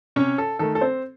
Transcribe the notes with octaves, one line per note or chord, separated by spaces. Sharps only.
C3 C#4 C#5
A4
D#3 A3 A4
A4
C4 C5